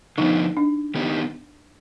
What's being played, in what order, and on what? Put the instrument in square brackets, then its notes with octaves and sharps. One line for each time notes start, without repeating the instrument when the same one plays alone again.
[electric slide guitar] D3 F3 B3 [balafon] D#4
[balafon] D4
[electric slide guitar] D#3 B3 D#4 G4